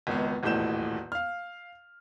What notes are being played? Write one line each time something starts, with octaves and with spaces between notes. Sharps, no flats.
G#1 C#2 B3
D#1 B1 E2 A2 G6 E7
F5 F6